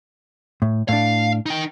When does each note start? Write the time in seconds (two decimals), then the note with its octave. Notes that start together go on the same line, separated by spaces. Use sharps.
0.62 A2
0.89 A2 D4 F5
1.46 D#4 G5